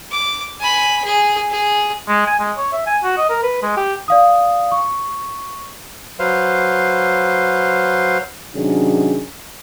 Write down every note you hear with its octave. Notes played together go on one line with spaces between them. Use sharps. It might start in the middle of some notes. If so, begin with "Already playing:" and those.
D6
G#5 B5
G#4
G#4
G#3
G#5
G#3
C#5
E5
G#5
F#4
D#5
A#4
B4
G#3
G4
D5 F5 D#6
C#6
F#3 B4 C5 F5
C3 D#3 F#3 C#4 D4 G#4